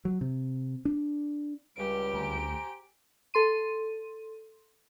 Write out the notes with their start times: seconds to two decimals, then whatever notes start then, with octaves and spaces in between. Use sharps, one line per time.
0.05 F#3
0.21 C3
0.85 D4
1.76 C#2 G3 G4 D7
2.14 D2 C5 G#5 A#5
3.34 A4 C6 D#7